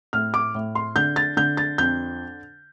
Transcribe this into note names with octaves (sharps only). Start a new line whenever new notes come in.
A2 F6
D6
A2
C6
D3 G6
A6
D3 G6
A6
F2 G6